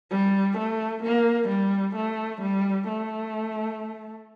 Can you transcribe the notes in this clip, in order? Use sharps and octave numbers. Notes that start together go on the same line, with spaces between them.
G3
A3
A#3
G3
A3
G3
A3